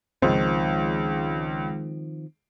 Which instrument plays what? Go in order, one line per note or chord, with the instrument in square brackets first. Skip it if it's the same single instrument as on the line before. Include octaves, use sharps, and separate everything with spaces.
[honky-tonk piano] C#2 [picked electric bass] D#3 F3 C4